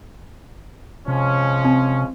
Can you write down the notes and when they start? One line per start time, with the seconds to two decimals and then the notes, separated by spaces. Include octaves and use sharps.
1.08 C3 F3 G#3 C#4
1.65 C4